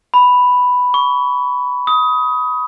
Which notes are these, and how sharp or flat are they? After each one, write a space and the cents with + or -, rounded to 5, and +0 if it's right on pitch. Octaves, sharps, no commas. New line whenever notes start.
B5 +5
C#6 +25
D#6 +20